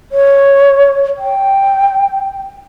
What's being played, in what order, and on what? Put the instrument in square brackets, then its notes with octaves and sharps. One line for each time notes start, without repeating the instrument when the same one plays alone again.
[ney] C#5
G5